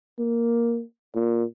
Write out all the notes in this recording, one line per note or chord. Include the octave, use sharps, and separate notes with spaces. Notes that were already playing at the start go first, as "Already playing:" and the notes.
A#3
A#2